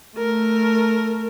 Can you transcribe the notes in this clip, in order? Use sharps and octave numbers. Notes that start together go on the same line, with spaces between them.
A3 A#4